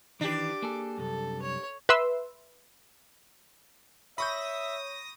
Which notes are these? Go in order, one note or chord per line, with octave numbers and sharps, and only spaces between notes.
D#3 E3 D4 G4 D6
A#3 G#4 A4
C2 F#2 A4
C#5
B4 E5 C6 E6
C#5 E5 B5 C#6 D#6 G6 A#6